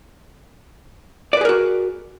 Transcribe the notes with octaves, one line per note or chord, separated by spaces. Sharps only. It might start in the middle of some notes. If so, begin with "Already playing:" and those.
F#4 G#4 A#4 B4 D5